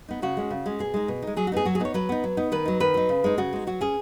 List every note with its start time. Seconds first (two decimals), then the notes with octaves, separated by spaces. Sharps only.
0.09 B3 D#4
0.22 C#3 F#4
0.37 G#3 C#4
0.50 C#3
0.66 G#3 C#4
0.79 B2 G#4
0.94 G#3 D#4
1.08 B2
1.22 G#3 D#4
1.36 F#3 G#4
1.47 F#4
1.52 B3 D#4 G#4
1.65 F#3 F#4
1.75 G#4
1.80 B3 D#4 C#5
1.94 F#3 B4
2.09 B3 D#4
2.24 F#3
2.37 B3 D#4
2.52 D#3 B4
2.65 F#3 D#4
2.80 D#3 B4
2.94 F#3 D#4
3.09 C#3
3.24 G#3 D#4
3.38 C#3 F#4
3.53 G#3 D#4
3.67 F#3 F#4
3.81 C#4 G#4